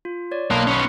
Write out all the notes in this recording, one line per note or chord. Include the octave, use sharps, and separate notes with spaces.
F4
C#5 D5
B1 A#3 F5 A5 B5 C6 D#6 F#6
B3 C#4 C7